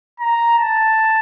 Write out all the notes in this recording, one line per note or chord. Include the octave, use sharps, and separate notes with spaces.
A#5
A5